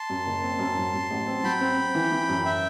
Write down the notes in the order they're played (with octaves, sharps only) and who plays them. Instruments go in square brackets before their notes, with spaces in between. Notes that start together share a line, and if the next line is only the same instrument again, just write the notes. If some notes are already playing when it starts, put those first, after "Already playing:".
Already playing: [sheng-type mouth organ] A5 C6
[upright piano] F#2
F#1
C4
F#2
F#3
F#3
A1
C4
[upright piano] F#3 [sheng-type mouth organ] G5 B5
[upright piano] C4
C4
E3
E3
F#2
[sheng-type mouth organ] E5 G5